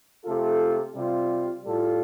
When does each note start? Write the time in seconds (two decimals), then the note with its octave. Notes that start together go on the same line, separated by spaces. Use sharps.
0.24 C3 A3 F4 A4
0.94 C3 G3 F4
1.64 A2 G3 F4 A4